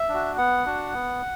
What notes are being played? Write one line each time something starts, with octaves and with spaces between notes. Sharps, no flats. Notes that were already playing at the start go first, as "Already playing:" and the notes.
Already playing: E5
D4
F#4
B3 F#5
D4 F#4
B3